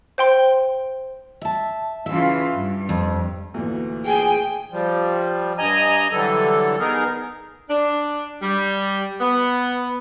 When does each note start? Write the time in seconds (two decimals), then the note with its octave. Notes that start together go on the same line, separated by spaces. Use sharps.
0.18 C5 G5 C6
1.41 E5 A5
2.06 C#3 E3 F4 E5
2.53 G2
2.89 F2
3.54 D2 A#2 E3
4.06 G#4 G5 G#5
4.72 F3 G3
5.58 G2 D#5 G#5 A#5
6.12 D3 E3 F#3 G3 A4
6.80 B3 D#4 G#4 A#4
7.70 D4
8.42 G3
9.21 B3